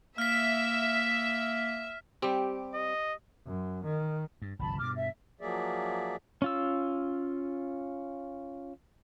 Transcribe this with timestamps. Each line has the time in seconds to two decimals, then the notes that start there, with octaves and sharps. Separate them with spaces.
0.18 A#3 E5 F6 B6
2.22 G3 C4 G4
2.74 D#5
3.46 F#2
3.84 D#3
4.42 G2
4.59 G1 C2 F3 A5 B5
4.78 G2 B2 D6 F6
4.95 E5
5.41 F3 F#3 A#3 G#4 D5 E5
6.42 C#4 F4 E6